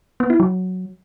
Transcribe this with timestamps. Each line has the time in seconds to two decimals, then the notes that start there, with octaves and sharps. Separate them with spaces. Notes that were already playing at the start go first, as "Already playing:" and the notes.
0.20 B3
0.30 E4
0.40 F#3